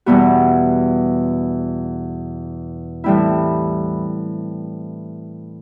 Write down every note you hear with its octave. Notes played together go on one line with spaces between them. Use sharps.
E2 B2 G3 B3 F#4
A2 E3 G3 C4 E4